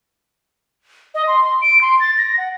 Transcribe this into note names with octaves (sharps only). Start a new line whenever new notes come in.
D#5
C6
C6
D7
C6
A6
A#6
F#5